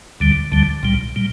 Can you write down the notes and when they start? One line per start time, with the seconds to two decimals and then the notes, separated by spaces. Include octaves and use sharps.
0.20 D2 D3 G3
0.52 D2 D3 G3
0.83 C2 A#2 G3
1.16 A#2 G3